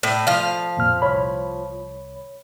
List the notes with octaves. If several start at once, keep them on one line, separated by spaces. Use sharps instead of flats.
A2
F3 F5
F2 A#2 F6
C2 C#5 B5